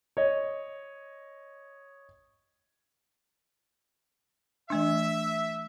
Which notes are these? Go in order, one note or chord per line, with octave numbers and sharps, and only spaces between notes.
C#5 D#5
E3 A3 D4 E5